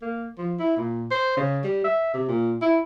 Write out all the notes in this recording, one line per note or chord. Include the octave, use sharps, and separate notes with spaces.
A#3
F3
E4
A#2
C5
C#3
G3
E5
C3
A#2
E4